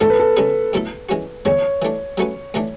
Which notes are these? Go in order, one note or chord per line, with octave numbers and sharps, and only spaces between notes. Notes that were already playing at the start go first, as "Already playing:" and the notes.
G#2 E3 A3 D4 A4
B4
A4
C#3 G#3 C#4 G#4 B4
B2 F#3 A3 E4 A4
E3 G#3 C#4 F#4
E2 D3 G#3 C#5
E3 A3 D4
F#3 A3 C#4 F#4 B4
A2 E3 A3 D4